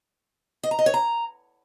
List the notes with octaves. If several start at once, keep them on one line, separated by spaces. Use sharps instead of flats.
D#5
A#5
D#5
C#5
A#5